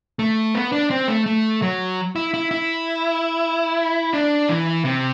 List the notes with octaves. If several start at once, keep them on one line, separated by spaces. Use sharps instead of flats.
A3
B3
D4
C4
A3
A3
F#3
E4
E4
E4
D4
E3
C3